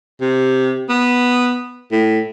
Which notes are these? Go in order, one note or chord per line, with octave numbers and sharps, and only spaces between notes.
C3
B3
A2